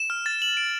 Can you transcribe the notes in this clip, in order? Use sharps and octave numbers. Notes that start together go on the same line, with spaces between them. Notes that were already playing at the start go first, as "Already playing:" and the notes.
Already playing: E7
F6
A6
F#7
D7